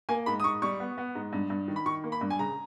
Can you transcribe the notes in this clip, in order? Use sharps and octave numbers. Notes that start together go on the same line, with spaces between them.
A#3 G#5
G#2 B5
D#6
G#2 C#6
G3 C#6
B3
B3
G#2
G2
G2
D#3
B5
D#3 C#6
A#3
B5
G2
G#5
C#3 A#5